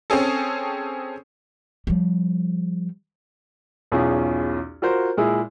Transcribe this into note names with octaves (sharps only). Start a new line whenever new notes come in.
C4 C#4 G#4 A4
F3 G3
B1 E2 C#4 F4 G#4
F4 F#4 A#4 C5
A#2 G#3 E4 G#4